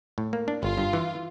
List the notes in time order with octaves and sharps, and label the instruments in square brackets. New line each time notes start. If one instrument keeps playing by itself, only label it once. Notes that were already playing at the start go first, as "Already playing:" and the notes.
[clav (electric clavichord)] A2
A#3
D4
[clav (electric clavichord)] G1 [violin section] F4
[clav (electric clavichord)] G2
E3